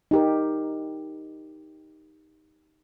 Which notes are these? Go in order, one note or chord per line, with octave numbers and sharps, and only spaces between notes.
D#4 G4 A#4